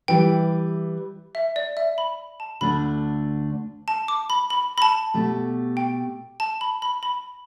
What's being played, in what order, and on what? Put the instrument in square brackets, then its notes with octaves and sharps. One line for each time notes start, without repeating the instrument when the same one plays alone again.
[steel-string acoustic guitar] E3 G3 E4 G4 B4 [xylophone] G5
[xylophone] E5
D5
E5
B5
A5
[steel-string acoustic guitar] D2 D3 A3 D4 [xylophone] B5
[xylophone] A5
D6
B5
B5
B5
A5
[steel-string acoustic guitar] B2 A3 G4
[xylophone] G5
A5
B5
B5
B5